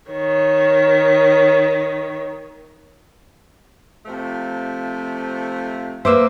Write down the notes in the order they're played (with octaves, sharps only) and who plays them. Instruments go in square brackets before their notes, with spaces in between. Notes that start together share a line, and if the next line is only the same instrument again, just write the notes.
[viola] D#3 C#5
[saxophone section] C3 F3 A3
[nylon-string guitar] A#3 B4 C5 [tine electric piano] E5 D6 E6